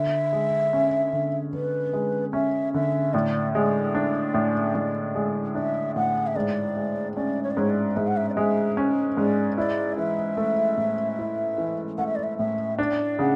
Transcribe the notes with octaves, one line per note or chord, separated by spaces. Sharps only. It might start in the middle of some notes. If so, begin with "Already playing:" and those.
Already playing: D3 E5
G#3
C#4
D3
D3 B4
G#3
C#4 E5
D3 E5
A2 D5
G#3 D5
D4
A2
A2
G#3
D4 E5
A2 F#5
E5
G#2 D5
G#3
C#4 D5
C#5
D5
G#2 C#5
D5
G#2 E5
F#5
E5
D5
G#3 E5
C#4
G#2 D5
E4 D5
E3 E5
A3
A2
E4
E3
A3 F#5
E5
D5
E5
A2 E5
D4 D5
C#3 F#5